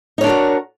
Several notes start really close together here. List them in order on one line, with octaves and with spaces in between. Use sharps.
D#4 C#5 D4 A#4 F#4